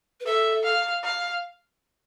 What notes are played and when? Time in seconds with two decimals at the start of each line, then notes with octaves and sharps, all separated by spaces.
0.20 B4
0.26 A4 E5
0.64 F5
1.03 F5